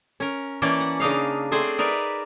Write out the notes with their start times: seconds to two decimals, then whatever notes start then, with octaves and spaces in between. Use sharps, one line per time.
0.20 C#4 A#4
0.62 E3 A#3 C#4 D5 G5 A5
0.80 F#5
1.00 C#3 D4 D#4 F5
1.51 A3 C4 G#4 C5 D5 G5
1.78 D#4 A#4 B4 D5 E5